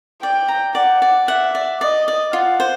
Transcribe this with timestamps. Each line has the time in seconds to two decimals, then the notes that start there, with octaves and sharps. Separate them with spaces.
0.23 D5 G5
0.48 A#5
0.75 D5 F#5
1.02 D5
1.28 E5 F#5
1.55 D5
1.81 D5 D#5
2.08 D5
2.33 F4 F#5
2.60 C5